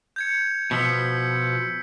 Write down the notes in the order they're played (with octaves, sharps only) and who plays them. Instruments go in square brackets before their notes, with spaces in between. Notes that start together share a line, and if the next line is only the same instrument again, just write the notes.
[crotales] G6 G#6 C#7
[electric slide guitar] B2 F3 [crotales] E6 B6 C#7